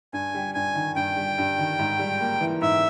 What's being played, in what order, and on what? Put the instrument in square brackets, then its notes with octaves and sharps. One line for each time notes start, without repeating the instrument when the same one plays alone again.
[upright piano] G2 [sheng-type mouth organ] G#5
[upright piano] G3
[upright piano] G2 [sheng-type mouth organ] G#5
[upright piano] D#3
[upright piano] G2 [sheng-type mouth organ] G5
[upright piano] G3
G2
D#3
G#2
G3
A#3
E3
[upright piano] G#2 [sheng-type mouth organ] E5